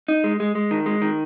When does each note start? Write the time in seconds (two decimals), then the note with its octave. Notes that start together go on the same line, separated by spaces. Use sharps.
0.08 D#4
0.24 G#3
0.40 G#3
0.55 G#3
0.71 D#3
0.86 G#3
1.02 D#3